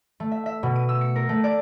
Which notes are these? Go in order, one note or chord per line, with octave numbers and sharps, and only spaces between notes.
A3
E5
E5
B2
D#7
E6
C#7
A#4
A3
D5